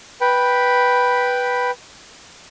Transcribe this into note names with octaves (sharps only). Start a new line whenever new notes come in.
B4 G5 B5